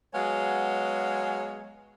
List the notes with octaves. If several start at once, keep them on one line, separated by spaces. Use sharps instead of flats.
F#3 G#3 B3 G#4 C#5 F5